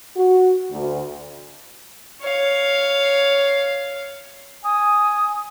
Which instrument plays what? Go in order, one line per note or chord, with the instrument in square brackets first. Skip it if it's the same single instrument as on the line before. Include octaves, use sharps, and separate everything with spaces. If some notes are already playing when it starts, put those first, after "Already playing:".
[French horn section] F#4
D2
[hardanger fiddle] C#5 F5
[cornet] G#5 [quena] D#6